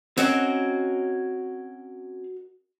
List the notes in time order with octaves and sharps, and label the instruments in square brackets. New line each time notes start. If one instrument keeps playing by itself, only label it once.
[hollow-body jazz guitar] C4 C#4 [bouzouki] F#4 A#4 D#5